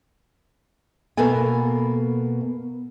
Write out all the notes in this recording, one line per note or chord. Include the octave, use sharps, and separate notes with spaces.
B2 A#3 B3 A4 G#5